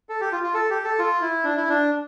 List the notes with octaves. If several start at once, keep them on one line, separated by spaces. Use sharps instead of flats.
A4
G4
F4
F4
A4
G4
A4
F4
E4
D4
E4
D4